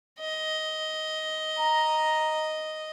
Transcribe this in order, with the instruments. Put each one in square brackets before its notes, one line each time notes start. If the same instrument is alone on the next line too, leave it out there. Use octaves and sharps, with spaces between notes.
[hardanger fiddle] D#5
[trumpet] A#5